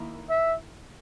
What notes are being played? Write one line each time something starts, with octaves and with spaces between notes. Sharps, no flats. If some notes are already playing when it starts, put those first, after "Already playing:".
Already playing: D#3 A#3 E4
E5